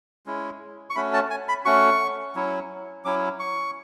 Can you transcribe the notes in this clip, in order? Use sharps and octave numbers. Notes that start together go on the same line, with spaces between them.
G#3 C#4 E4
C#6
A3 C#4 F#4 B5
A5
G#5
B5
A3 C#4 F#4 C#6
F#3 C#4 E4
F#3 C#4 E4 D6
C#6